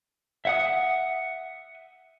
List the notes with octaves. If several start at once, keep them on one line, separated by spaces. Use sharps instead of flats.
E5 F#5 D#6